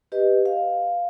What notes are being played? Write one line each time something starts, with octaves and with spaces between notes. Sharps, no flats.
G4 B4 D#5
F5